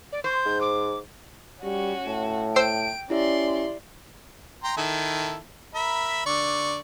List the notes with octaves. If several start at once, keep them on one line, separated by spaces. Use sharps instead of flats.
D5
C5 G6
G#2
D6
G3 C#4 F#4
A2
C5 G5 E6 G6 C7 D7
C#4 E4 G4 D5 E5 C6
G5 A#5 C6
D#3 E4 A4
A#4 E5 B5
D3 D5 C#6